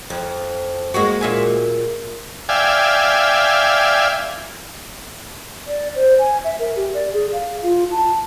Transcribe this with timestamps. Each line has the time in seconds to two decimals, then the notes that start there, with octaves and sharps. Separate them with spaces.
0.10 F2
0.94 G#3 A#3 F#4
1.21 A#2 E5 G#5
2.49 D5 E5 F5 G5 G#5
5.67 D5
5.95 C5
6.19 G#5
6.44 E5
6.59 A#4
6.76 G4
6.94 D5
7.13 G#4
7.33 F5
7.63 F4
7.92 A5